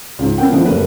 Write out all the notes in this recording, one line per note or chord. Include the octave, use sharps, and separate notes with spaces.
C#2 G#2
B3 C#4 A#4 F#5 G5
A#2 D3 E3 F3 B3
F#1 G3 A3 A#4 B4